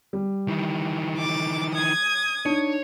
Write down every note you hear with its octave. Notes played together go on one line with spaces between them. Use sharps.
G3
D#3 E3
D6 A6
D#6 G#6
D4 D#4 C#5